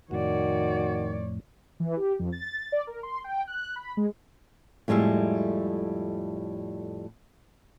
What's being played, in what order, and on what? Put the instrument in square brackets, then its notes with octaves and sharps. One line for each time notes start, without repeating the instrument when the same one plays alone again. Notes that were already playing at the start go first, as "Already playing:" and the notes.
[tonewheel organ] F2 A2 [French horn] D#3 [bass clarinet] F#4 [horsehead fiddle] C#5 D5
[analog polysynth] E3
G4
F2
A6
D5
A#4
C6
G5
F#6
B5
G#3
[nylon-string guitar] F2 A2 G3 G#3 E5